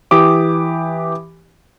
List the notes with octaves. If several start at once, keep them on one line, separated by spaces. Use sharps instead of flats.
E3 G4 D6 D#6